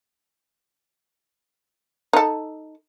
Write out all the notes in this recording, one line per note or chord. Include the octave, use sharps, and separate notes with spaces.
D#4 A4